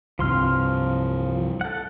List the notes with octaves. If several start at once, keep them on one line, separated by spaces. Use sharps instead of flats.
C2 G2 C3 F3 C6 F6
A4 F#5